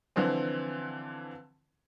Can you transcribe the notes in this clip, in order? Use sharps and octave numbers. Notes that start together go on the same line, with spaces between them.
D3 E3 F3 C4